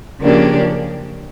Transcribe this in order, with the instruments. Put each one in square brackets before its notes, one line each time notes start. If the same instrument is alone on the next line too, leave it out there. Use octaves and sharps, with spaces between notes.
[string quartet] C#3 F3 A#3 D4 G4